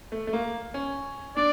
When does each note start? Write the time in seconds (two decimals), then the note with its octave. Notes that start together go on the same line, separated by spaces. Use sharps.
0.12 A3
0.27 A3
0.33 A#3
0.74 C#4
1.36 D4 D5